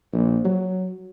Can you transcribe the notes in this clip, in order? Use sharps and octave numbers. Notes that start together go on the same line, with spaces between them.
A#1
F#3